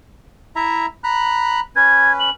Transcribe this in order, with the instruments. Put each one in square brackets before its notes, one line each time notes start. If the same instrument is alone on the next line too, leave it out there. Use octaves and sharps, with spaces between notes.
[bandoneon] E4 E5 A#5
A#5 B5 F#6
[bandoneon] C#4 B4 [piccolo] G#6
[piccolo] F#7